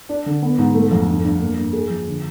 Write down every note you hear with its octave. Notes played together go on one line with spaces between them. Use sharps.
D4
D3
B3
G#2
A3
F2
G2
G2
A#3
G2
G#4
F3
D3